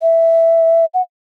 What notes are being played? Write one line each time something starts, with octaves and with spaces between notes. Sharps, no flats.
E5
F#5